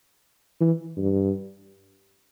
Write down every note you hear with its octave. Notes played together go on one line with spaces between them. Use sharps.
E3
G2